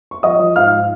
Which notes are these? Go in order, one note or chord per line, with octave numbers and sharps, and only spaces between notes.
C#6
F3 D#5 D#6
F3
G#2 F5 F6